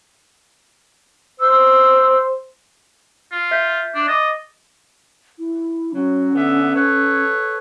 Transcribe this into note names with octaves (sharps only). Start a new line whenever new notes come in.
C5 E6
F4
E5 G6 B6
D4
D#5 D6 A6
E4
F#3 C#4
D3 B3 E5
A4 B4 C#5